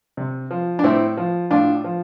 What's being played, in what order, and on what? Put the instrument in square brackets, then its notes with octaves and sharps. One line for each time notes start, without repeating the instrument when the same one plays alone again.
[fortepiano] C3
F3
D4
A2 C4 E4
F3
A2 D4 F4
F3